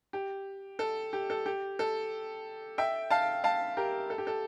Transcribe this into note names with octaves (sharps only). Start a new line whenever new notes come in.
G4
A4
G4
A4
G4
A4
E5 G5
F5 A5
F5 A5
G4 A#4
A4
G4
A4